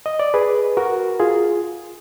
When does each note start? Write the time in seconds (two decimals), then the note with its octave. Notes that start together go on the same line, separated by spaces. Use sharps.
0.06 D#5
0.20 D5
0.34 G#4 B4
0.77 F#4 A#4
1.20 F4 G#4